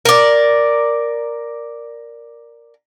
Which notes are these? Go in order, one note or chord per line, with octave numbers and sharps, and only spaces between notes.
A#4 D5